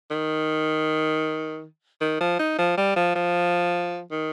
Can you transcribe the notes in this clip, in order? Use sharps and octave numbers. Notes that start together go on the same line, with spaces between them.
D#3
D#3
F3
D#4
F3
G3
F3
F3
D#3